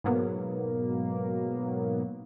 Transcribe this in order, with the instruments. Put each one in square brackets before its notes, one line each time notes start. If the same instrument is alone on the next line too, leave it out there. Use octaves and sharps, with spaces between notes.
[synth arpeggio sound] G#2 B2 F#3 A#3 B3